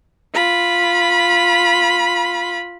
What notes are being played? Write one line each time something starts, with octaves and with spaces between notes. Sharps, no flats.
F4 B5